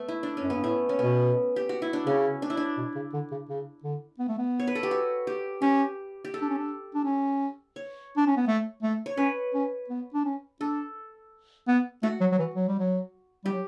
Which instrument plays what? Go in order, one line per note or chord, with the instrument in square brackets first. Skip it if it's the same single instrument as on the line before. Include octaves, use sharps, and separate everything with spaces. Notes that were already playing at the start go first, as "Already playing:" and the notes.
Already playing: [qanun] A3 B3
E4
D4
C#4
[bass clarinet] F#2
[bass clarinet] G2 [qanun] B3
[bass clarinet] A2 [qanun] A3
[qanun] C#4
[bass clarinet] B2 [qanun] B3
[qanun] G4
F#4
E4
D4
[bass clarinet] C#3 [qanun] C#4
[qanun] D4
E4
D4
[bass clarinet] B2
C#3
D3
C#3
C#3
D3
B3
A3
B3
[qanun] C#5
B4
A4
G4
F#4
G4
[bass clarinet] C#4 [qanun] G4
[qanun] G4
A4
[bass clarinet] D4
C#4
D4
D4
C#4
[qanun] C#5
[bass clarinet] D4
C#4
B3
A3
A3
[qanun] C#5
[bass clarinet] C#4 [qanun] B4
[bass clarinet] C#4
B3
D4
C#4
[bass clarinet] D4 [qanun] A4
[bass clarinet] B3
[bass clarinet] A3 [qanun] F#4
[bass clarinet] F#3
F#3
E3
F#3
G3
F#3
[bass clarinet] G3 [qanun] G4
[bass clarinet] F#3